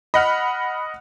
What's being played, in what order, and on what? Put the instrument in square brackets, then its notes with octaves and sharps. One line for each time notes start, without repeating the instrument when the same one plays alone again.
[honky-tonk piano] D#5 F#5 F6 [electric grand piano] B5